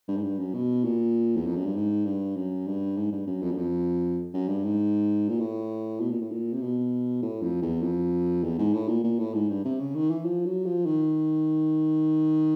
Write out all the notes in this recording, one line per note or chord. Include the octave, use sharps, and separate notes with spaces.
G2
G#2
G2
F#2
B2
A#2
E2
F2
F#2
G2
G#2
G2
F#2
G2
G#2
G2
F#2
F2
F#2
F2
F#2
G2
G#2
A#2
A2
B2
A#2
A2
A#2
C3
B2
A2
F2
E2
F2
E2
G#2
A2
A#2
A#2
A2
G#2
G2
C3
C#3
D#3
E3
F3
F#3
F3
D#3